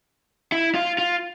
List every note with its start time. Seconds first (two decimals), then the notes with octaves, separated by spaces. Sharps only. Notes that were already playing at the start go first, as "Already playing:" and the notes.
0.52 E4
0.75 F4
0.98 F4